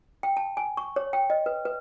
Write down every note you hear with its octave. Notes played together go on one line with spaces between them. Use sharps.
G5
A5
G#5
C#6
C#5
G5
D#5
B4
B4